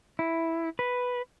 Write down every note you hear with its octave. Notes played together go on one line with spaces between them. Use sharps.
E4
B4